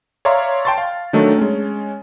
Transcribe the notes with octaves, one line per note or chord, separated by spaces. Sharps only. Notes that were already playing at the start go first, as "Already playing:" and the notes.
C#5 D5 E5 F5 A#5 C6
G5 A5 C6 C#6 A6
F5
D#3 F#3 A3 D4 D#4
G#3 C#4